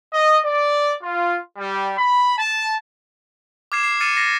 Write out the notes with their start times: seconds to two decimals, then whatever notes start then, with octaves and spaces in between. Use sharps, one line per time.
0.13 D#5
0.44 D5
1.01 F4
1.58 G3
1.97 B5
2.37 A5
3.72 D6 F6 G#6 C7 E7
3.84 C7
4.01 D6 F6 A6 C#7 D#7 E7
4.16 A6 A#6 C7 C#7